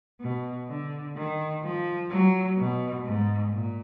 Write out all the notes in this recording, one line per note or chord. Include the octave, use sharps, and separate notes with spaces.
B2
D3
D#3
F3
F#3
B2
G#2
A#2